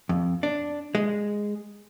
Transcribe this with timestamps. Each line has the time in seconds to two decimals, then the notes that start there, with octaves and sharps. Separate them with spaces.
0.09 F2
0.43 D4
0.95 G#3